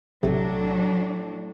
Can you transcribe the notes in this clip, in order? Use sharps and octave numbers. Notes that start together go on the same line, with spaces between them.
B1 A2 C3 F#3 A3 D4